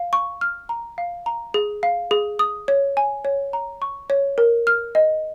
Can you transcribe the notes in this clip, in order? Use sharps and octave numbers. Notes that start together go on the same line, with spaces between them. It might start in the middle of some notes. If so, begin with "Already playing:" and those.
Already playing: F5
C#6
F6
A#5
F5
A#5
G#4
F5
G#4
D#6
C#5
G#5
C#5
A#5
C#6
C#5
A#4
F6
D#5